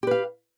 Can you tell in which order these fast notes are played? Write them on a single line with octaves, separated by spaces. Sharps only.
G4 B4 F5